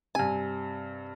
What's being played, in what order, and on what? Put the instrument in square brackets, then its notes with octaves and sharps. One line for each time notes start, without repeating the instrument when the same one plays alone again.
[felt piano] G2 C3 [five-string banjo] G#5